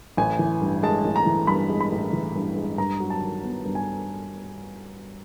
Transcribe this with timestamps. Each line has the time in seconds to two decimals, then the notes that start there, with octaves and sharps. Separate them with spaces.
0.17 A1 G#5
0.39 E3
0.62 G2
0.83 G#3 A5
1.05 A1
1.16 A#5
1.26 E3
1.47 G2 B5
1.69 G#3
1.81 B5
1.92 A1
2.13 E3
2.35 G2
2.57 G#3
2.78 G2 A#5
3.00 F#3
3.10 A5
3.21 D#3
3.43 B3
3.65 G2
3.75 G#5